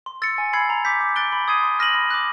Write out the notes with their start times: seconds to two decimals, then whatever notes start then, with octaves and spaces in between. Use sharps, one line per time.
0.06 C6
0.22 E6 A6 C#7
0.38 G#5
0.53 B5 E6 G#6 C7
0.70 A#5
0.85 D6 G6 B6
1.01 D6
1.16 F#6 A6 D7 G7
1.32 B5
1.48 D#6 G#6 C7 D#7
1.63 C6
1.79 F6 A#6 D#7 F#7
1.95 B5
2.11 D6 F#6